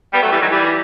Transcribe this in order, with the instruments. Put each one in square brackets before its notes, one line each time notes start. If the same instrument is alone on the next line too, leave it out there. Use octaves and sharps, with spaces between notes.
[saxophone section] G3 B3
F#3 A3
E3 G3
D#3 F#3
E3 G3